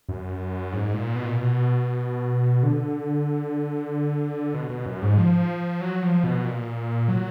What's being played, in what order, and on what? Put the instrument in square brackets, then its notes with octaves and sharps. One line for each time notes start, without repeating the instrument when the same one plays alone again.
[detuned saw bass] F#2
G#2
A#2
B2
A#2
B2
D3
B2
B2
F#2
G#2
F3
F#3
F3
B2
A#2
F#3